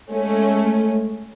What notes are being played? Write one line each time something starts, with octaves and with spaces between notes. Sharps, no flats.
G#3 A3 C#4